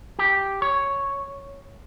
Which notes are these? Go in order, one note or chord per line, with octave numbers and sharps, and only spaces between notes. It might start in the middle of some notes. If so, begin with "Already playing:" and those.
G4
C#5